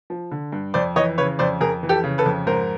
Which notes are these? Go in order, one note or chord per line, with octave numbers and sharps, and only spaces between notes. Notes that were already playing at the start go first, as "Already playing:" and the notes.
F3
D3
G2
F2 C5 D5
E3 C#5 D#5
C#3 B4 C#5
F2 C5 D5
F2 G#4 A#4
E3
G4 A4
C#3
A4 B4
F2
G#2 A#4 C5